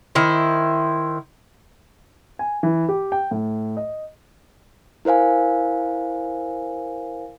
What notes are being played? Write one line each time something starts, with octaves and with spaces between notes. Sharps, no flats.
D#3 E4 C5
G#5
E3
G4
G5
A2
D#5
E4 A#4 C5 F5 G#5